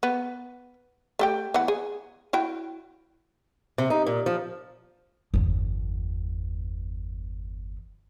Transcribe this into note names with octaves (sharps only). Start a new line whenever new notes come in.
B3
A3 G4 G5
E3 B3 F#5
G#4
E4 F#4 G5
C3
D#4
A#2
F3
G1 E2